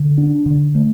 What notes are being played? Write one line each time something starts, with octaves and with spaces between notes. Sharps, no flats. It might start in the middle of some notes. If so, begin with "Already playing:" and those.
Already playing: D3
D4
D3
A3